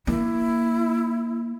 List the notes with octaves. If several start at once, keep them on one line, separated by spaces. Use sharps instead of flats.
A#3 E4